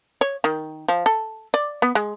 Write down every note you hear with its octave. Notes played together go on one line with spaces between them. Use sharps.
C#5
D#3
F3
A4
D5
B3
G#3